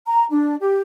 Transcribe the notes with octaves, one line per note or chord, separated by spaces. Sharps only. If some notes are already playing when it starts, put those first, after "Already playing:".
A#5
D4
G4